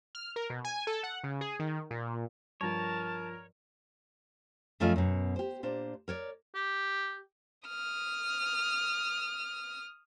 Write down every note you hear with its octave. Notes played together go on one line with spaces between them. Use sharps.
F6
A#4
B2
G#5
A4
F#5
C#3
G#4
D#3
A#2
G2 F3 A#4 C#5 A5
F#2 F3 A3 F4 G#4 D#5
F#2 B2
G4 C5
A#2 D4 C5
A#4 C#5 D5
G4
D#6 F6